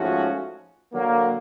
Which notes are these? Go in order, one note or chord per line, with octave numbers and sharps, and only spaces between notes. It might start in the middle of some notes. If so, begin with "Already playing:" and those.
Already playing: G#2 F3 A3 C#4 F#4
D3 F#3 A#3